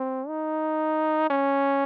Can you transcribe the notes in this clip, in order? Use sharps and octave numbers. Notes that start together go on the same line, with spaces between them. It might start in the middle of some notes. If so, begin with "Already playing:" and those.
Already playing: C4
D#4
C#4